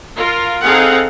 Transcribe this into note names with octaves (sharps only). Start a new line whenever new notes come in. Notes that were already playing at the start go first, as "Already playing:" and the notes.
F4 A#4
C4 D#4 G#4 A4 F5 F#5